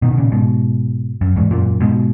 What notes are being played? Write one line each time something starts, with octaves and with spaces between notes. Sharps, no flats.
B2 D#3
B2
A#2 C#3
G#2 B2
F#2
E2 G#2
F#2 A#2
G#2 B2